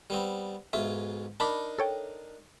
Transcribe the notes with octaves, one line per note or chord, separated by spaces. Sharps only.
G3 B3 C4
B1 G#2 F4 E5
D4 D#4 A#4 A5 B5 D6
A4 C#5 G5